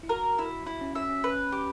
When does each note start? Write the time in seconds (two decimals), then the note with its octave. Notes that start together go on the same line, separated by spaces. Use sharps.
0.03 E4
0.09 F#4 A#4
0.38 E4
0.67 E4
0.81 C#4
0.95 C#4 E5
1.09 C#4
1.24 C#4 B4
1.52 G4